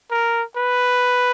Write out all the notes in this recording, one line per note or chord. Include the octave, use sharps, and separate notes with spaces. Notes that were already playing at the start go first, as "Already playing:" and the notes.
A#4
B4